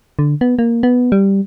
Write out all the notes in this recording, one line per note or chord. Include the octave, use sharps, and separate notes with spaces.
D3
B3
A#3
B3
G3